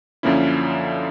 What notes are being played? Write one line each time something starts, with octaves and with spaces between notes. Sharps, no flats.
F#2 D3 F3 A#3 C#4 E4